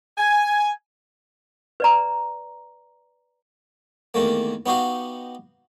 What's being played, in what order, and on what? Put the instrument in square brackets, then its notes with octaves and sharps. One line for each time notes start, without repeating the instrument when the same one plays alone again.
[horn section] G#5
[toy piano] B4 D5 A#5
[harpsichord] E2 D#3 A3 A#3
B3 D#4 F#4 G4 F5